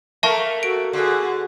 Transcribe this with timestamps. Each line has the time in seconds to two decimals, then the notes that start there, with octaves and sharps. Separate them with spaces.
0.23 A3 A#3 A#4 E5 A5 C#6
0.63 F#4 A4 D7
0.93 D3 F#4 G#4